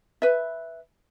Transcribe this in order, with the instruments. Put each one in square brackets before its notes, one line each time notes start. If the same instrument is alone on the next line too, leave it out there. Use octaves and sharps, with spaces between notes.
[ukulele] B4 E5